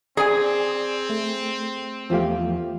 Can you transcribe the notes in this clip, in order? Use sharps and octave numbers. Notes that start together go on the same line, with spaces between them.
C4 G#4 D5 G#5
A3
E2 F3 A3 F4 G4 F5